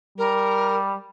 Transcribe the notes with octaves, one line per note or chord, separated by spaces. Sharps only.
G3 A#4